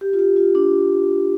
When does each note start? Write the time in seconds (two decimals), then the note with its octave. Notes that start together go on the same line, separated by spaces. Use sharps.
0.01 G4
0.13 F4
0.19 G4
0.36 F4
0.55 D4